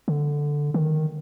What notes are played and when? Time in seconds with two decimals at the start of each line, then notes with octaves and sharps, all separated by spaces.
0.08 D3
0.74 D#3